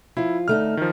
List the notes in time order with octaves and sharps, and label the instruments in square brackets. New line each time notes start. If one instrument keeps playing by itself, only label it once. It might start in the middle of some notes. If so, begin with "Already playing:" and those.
[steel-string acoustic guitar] F3 F4 [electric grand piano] E4
[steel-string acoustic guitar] D2 A3 D#4 [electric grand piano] F6
[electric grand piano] D#3 F3